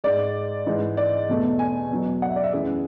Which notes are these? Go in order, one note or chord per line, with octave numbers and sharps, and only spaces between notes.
G#2 G#3 D5
G#2 E3 G#3
D5
E2 B2 A3
G#5
E2 B2 F#3
F#5
E5
D5
E5
F#2 E3 A3 G#4